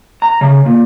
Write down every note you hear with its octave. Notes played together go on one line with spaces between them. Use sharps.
A#5
C#3
A#2